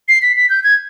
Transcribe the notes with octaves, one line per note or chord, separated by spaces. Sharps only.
C7
B6
B6
G6
G#6